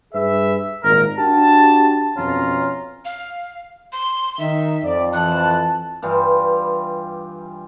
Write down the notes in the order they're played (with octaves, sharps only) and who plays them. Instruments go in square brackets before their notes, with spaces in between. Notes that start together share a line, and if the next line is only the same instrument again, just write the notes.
[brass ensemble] G2 G#4 B4 E5
G#1 A#2 A#4
D4 F#4 G4 A5
F2 B2 C#4 F4 A#5
[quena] F5
C6
[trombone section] D#3 D#4 [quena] E5
[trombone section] F2 [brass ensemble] D5
[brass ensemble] E3 A5 [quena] F#6
[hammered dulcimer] G2 E3 G3 F4